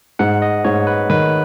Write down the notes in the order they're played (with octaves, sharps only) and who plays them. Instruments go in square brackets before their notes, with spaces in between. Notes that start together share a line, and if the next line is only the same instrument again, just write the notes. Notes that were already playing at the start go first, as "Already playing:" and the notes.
[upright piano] G#2 [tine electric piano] F#5
[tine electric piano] D#5
[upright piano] G#2 [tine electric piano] C#5
[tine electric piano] B4
[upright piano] D#3 [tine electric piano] B4